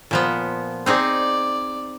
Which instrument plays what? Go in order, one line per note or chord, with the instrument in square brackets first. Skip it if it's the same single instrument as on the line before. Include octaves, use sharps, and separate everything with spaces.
[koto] A#2 F3 B3
[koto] C4 D#4 G#4 [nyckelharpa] D5